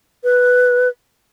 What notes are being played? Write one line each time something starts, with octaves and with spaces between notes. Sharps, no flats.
B4